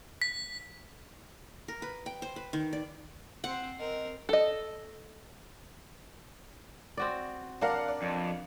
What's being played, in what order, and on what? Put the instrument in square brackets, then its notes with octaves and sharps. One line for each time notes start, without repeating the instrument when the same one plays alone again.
[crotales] B6
[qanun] A#4
B4
G5
C5
B4
D#3
D5
[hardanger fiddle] C4 C5 [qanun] F#5
[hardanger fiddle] C4 A#4 [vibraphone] D#5
[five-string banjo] A4 D#5
[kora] C4 F#4 D5
[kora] D4 A#4 [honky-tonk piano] D5 F5 F#5
[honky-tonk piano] D5
[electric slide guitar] F2